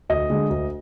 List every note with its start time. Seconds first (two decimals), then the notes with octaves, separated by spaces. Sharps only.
0.09 D2 D#5
0.30 D3 G#3
0.50 D2